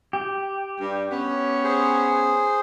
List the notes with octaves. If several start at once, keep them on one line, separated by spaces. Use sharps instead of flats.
G4
G2
B3 C#4
G#4 C5